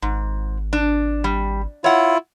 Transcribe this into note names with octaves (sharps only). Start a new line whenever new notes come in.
G#1 G#2
D4
G3
E4 F4 C#5 F#5